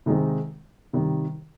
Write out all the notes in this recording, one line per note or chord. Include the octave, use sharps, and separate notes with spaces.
C3 D#3 G#3 C4 D#4
C3 D#3 G3